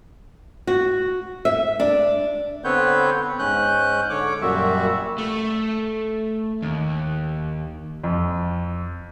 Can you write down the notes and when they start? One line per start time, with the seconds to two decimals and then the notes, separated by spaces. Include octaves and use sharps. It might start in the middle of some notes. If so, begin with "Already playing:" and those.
0.67 F#4
1.45 E5
1.80 D4
2.64 D3 B3 C4 B4 C#5 G6
3.39 G#2 C#4 F#6 G6
4.10 D3 C#5 D6
4.42 F#2 A#2 G3 F#4 E5
5.18 A3
6.62 D#2
8.04 F2